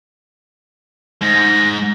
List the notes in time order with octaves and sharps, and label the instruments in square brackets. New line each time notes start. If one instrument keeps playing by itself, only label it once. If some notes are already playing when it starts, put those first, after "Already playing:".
[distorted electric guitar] G#2 [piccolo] A#6